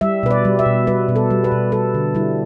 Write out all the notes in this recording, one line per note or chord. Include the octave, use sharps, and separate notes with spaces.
G3 E5
B2 B4
D5
G3
E5
B2
G3 B4
B2
A4
G3
B4
B2
G3 A4
D3
G3 E4